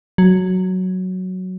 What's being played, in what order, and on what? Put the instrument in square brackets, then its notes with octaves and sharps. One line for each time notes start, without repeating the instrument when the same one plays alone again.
[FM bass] F#3